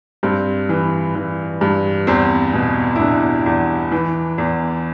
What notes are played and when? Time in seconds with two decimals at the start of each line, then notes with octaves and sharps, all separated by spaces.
0.23 G2 C4
0.69 E3
1.15 E3
1.61 G2
2.07 E2 C4
2.54 B2
2.96 E4
3.00 B2 D4
3.46 E2
3.92 E3
4.38 E2